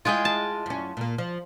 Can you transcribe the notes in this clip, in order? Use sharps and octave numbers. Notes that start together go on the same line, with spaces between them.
G#3 E4 F4 G#4 G5
A5
F#2 C#4
A#2 A#3
F3